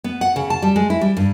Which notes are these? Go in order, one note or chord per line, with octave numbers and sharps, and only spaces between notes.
B3
F#5
C#3
A5
G3
G#3
E4
G3
G2